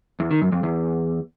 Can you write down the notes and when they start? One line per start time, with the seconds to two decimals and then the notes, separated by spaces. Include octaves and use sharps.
0.20 E2
0.31 D#3
0.41 F#2
0.52 F2
0.63 E2